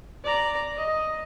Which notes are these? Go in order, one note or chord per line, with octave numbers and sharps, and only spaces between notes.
D5 A#5
D#5